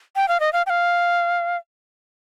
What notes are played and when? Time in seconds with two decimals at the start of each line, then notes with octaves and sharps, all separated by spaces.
0.16 G5
0.28 F5
0.40 D#5
0.53 F5
0.66 G5
0.70 F5